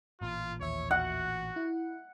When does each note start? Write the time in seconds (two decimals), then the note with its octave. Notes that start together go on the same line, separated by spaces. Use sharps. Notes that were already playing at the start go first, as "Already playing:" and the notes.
0.21 A1 A#2 F4
0.61 D#2 C#5 E5
0.91 F#4 F#5
1.56 E4